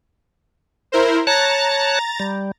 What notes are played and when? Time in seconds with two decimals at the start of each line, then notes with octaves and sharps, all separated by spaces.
0.92 E4 A#4 C5
1.27 C#5 A5 A#5 F#6 A6
2.20 G3